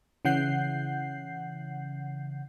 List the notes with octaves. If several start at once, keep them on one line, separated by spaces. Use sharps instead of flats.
C#3 E3 F#5 G6 C7